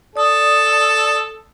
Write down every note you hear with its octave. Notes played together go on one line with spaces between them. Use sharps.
A4 D5 D#6